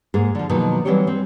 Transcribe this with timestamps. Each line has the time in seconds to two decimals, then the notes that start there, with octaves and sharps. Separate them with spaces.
0.14 G#2 A#3 G#4
0.35 D3 F3
0.49 B2 D#3 F3 F#3 A#3
0.85 E3 F#3 G3 C4 G4 C#5
1.07 C4